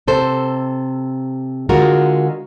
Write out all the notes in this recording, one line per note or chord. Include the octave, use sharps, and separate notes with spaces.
C3 A4 C5
D3 G#3 F4 F#4 A#4